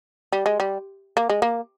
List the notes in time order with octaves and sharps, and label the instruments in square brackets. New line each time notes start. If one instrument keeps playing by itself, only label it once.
[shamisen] G3
G#3
G3
A#3
G#3
A#3